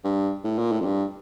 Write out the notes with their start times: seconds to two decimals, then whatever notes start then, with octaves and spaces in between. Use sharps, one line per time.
0.04 G2
0.44 A2
0.58 A#2
0.72 A2
0.81 F2
0.86 G2